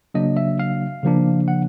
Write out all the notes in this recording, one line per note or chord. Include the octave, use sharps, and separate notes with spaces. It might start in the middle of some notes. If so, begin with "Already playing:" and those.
C#3 F#3 A#3 D4 D#5
E5
F5
C#3 F3 A#3 D4
F#5